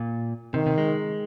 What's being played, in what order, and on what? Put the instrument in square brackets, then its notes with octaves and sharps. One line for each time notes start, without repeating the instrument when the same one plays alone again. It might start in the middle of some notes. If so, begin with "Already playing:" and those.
Already playing: [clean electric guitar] A#2
[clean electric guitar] C3 [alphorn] D#3
[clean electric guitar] C3
G#3